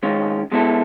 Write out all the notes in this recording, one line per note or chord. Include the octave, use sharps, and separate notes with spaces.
G#2 D#3 G#3 C#4 F4
B2 G#3 B3 E4 A4